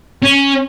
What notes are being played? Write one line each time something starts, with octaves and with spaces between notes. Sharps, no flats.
C#4